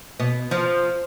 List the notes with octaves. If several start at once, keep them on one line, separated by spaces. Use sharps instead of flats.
B2
F3